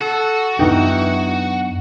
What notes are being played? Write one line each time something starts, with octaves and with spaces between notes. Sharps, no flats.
F#4 A4
F#2 E3 B3 D4 D#4 G5